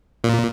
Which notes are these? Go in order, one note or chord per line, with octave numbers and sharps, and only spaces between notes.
A#2